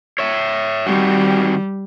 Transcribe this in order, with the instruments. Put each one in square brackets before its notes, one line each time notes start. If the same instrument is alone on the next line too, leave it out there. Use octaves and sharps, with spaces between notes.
[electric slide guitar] C#5 E5
[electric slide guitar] D#3 C4 F#4 [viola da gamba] G3